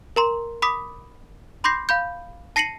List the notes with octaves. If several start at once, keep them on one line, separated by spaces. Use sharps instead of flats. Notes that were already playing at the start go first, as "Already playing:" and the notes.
A#4 A#5 C6
B5 D6 D#6 B6
B5 C6 D6 G6 A#6 C7
F5 B5 G6
A5 A#6 C7 C#7 D#7 F#7